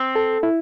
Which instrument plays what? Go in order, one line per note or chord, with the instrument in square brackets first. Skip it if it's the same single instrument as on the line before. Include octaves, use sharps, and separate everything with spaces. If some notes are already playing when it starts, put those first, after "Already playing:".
Already playing: [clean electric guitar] C4
[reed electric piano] A4
E4